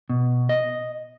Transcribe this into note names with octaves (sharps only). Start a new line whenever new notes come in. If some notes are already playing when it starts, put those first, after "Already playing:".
B2
D#5